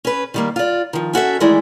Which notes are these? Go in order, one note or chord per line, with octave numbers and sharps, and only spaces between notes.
C#4 B4
D#3 G3 A#3
F4 D5
D#3 F3
C#4 F#4 A4 E5
D#3 E3 G#3 A3 E4 D5